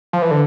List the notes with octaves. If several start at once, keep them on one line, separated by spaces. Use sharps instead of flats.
F3
E3
D3